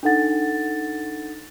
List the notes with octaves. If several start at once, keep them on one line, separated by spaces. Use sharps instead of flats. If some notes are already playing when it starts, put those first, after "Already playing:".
D4 D#4 A4 F#5 A6